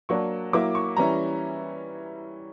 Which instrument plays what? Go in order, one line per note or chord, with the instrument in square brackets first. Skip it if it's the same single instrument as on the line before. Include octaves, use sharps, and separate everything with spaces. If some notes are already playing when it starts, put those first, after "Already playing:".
[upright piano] F#3 A#3 D4 C#6
F#3 A#3 E4 D6
C#6
E3 G3 C#4 E4 A#5